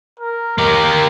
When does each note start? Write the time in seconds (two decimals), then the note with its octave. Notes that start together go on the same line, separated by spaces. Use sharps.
0.20 A#4
0.58 A#3 G4 A#4